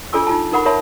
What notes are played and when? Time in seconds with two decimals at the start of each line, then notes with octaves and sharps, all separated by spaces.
0.13 D4 F4 A4 G#5 D6 E6
0.27 D#4 F4 A5
0.52 D#4 A#4 F#5 B5 D6
0.65 A#4 C#5 E5 A5 B5